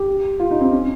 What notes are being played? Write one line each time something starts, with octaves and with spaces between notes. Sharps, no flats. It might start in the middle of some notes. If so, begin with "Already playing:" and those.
Already playing: G4
F4
D#4
C4
C#4